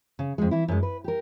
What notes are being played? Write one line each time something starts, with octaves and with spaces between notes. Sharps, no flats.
C#3
F2 G#3
E3 E4
F#2 G#3
B4
G4 A#4